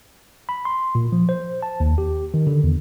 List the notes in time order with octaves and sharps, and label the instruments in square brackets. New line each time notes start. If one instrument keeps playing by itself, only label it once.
[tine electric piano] B5
C6
A#2
F3
C5
A5
D#2
G4
D#3
D3
E2